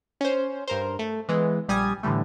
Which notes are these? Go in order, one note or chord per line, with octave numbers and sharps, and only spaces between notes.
C#4 C5
G2 A#4 C5
A3
E3 G#3 B3
A#1 G3 G#5 D#6 G#6
A2 D3 E3 G3 A3